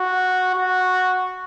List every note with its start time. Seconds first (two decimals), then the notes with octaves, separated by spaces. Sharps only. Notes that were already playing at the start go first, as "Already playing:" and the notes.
Already playing: F#4
0.55 F#4